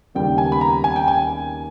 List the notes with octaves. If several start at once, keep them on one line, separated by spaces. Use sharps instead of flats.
D#2 C#3 G3 B3 G5
G#5
B5
A#5
G#5
G5
G#5